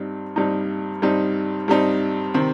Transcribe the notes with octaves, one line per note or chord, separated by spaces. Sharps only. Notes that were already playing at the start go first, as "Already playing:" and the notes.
Already playing: G2 G3 C4 D#4
G2 G3 C4 D#4
G2 G3 C4 D#4
G2 G3 C4 D#4
C3 D#3 C4